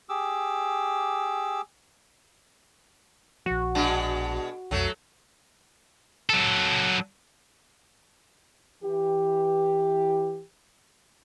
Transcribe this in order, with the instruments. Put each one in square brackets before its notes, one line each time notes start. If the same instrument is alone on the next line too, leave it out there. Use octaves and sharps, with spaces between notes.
[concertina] G4 G#4 D6 E6
[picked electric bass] A#1 F3 [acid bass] F#4
[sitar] B2 G#3 D4
[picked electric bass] B1 F2 [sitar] F#3 A3
[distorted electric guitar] F#3 A4
[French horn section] E3 G4